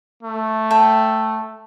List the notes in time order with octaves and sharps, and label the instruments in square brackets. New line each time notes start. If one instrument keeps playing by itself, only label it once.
[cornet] A3
[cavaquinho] A4 E5 G5